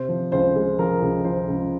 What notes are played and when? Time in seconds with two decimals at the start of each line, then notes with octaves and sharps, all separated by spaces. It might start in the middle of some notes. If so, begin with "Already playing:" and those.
Already playing: C3 C5
0.09 F3
0.32 C#2 C5
0.56 G#3
0.79 F3 A#4
1.02 C#2
1.24 F3 C5
1.48 C#2